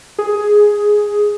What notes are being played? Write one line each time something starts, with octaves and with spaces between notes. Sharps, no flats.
G#4